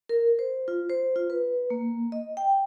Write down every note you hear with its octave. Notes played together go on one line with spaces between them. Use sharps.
A#4
C5
F4
C5
F4
B4
A#3
D#5
G5